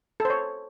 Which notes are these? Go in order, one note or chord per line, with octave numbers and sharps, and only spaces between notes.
A4
C5
C#5